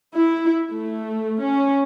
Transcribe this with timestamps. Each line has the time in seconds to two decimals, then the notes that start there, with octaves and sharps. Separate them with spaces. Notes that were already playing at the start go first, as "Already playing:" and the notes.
0.14 E4
0.72 A3
1.42 C#4